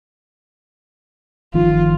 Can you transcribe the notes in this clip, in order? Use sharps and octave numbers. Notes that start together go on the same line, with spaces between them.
G1 D#3 F3 F4